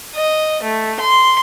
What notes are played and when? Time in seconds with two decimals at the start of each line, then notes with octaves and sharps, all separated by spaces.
0.16 D#5
0.63 A3
1.00 C6